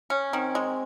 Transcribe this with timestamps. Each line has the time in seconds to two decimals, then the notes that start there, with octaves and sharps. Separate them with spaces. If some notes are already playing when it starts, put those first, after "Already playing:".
0.10 C#4
0.33 D#3 C4
0.55 G#3